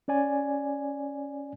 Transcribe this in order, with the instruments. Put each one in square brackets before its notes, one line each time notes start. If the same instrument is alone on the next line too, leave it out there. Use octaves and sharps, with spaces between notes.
[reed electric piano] C#4 C#5 D5 G#5